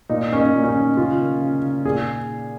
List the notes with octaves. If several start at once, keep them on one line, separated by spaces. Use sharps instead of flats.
A#2 D#4
A#3 C#4
D#4
A#2
C#4
D#4
C#4
C#3 F4
A#3
C#3
D#4
A#2 G#4